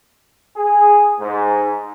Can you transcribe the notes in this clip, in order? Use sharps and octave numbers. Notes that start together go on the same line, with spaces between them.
G#4
G#2